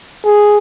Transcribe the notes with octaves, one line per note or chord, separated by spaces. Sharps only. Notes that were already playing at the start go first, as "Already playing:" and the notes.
G#4